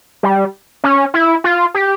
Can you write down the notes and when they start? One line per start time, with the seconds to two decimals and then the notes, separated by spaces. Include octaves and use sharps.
0.23 G3
0.84 C#4
1.14 E4
1.44 F4
1.74 G4